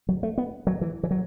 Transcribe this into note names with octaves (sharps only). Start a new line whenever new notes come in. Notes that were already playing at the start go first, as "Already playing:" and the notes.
F#3
A3
B3
F#3
E3
E3
F#3